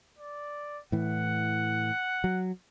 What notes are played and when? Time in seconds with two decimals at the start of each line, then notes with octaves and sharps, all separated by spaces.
0.19 D5
0.92 A2 E3 F#5
2.24 F#3